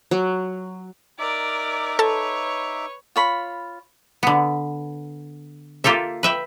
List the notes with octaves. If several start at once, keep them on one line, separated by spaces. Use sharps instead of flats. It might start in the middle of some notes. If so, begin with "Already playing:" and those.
F#3
D#4 A#4 D5 E5 D6
A4 B4 C#5 A5
F4 C#5 B5
D3 B3
A#3 F4 G4 A4 E5
B4 E5 G5